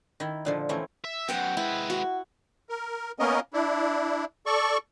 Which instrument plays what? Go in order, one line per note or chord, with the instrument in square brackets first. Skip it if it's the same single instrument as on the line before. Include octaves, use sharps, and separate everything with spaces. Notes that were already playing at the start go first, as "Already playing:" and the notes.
[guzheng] D#3 E4
A#2 D3 F3
E3 A3 C4 C#4 E4
[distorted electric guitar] E5
[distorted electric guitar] F#2 B2 [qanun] C5 F#5 G5
[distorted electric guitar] G#3 B4 [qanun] E4
[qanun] F#4
[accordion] A#4
A#3 B3 C#4 A#4 D#5
D4 E4
A4 D5 C#6